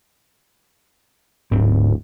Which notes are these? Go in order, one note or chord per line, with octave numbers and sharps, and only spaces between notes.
D1 G#2 C4